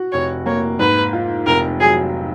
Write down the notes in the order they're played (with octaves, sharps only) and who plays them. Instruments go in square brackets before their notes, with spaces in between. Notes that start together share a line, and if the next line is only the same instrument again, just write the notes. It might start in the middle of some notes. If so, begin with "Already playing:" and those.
Already playing: [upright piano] F#4
[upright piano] F1 [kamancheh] C#5
[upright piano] A#3 [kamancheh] C#5
[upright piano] G#2 [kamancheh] B4
[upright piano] F4
[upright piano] F1 [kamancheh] A#4
[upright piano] F#3 [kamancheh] G#4